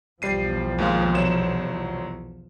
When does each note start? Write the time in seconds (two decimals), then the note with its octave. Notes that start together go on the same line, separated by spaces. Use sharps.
0.22 B1 E2 F3 G3 C7 D#7
0.78 D#2 G#3 F5
1.14 C2 F#3 E7